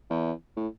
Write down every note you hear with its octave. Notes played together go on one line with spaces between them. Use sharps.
E2
A2